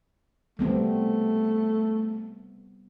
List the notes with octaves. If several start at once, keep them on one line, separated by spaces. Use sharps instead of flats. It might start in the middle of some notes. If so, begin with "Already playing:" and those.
G3 A3 B3 C4